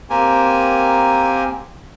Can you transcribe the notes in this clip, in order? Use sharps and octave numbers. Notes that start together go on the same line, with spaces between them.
A#3 C4 G4 A#4 G#5